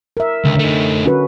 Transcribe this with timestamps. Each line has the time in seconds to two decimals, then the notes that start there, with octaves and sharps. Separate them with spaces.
0.17 A#4 E5
0.45 C#2 D3
0.59 A3 D#4
1.05 C#4 F#4 B4